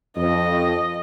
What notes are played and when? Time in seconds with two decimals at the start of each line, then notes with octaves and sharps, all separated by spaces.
0.18 F2 D#5